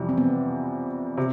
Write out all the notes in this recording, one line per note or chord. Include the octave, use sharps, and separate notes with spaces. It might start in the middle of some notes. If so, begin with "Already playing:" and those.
Already playing: F2 C3 E3 G3
C4
B3
C3